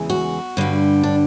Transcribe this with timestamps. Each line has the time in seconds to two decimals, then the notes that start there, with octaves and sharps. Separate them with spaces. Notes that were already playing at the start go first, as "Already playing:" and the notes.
Already playing: E2 C#3 E3 G#3
0.10 F#4
0.57 G2 D3 G3
1.03 D4